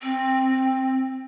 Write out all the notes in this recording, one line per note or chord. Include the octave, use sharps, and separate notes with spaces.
C4